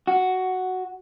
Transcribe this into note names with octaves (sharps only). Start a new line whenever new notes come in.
F#4